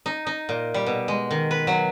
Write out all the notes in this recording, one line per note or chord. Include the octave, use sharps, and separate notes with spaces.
D#4
D#4
A#2
G3
B2
G#3
D#3
B4
F#3